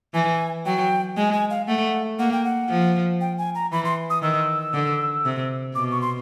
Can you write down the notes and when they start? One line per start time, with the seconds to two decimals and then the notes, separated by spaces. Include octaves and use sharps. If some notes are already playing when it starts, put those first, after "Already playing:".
0.14 E3 G#5
0.65 F#3 G5
1.17 G#3 G#5
1.33 G#5
1.50 F5
1.67 A3 F#5
2.19 A#3 F#5
2.32 G5
2.45 F#5
2.69 F3
3.21 G5
3.38 G#5
3.55 A#5
3.72 E3 B5
3.85 C6
4.10 D#6
4.22 D#3 E6
4.74 D3
5.25 C3
5.75 B2 D6
5.91 C#6
6.01 C6